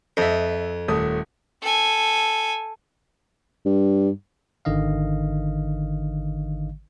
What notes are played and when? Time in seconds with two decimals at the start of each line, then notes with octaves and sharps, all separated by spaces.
0.17 F2 D#5 E5
0.88 D#1 A3 D#6
1.63 A4 G#5
3.65 G2
4.65 G#1 D3 D#3 D#5 F5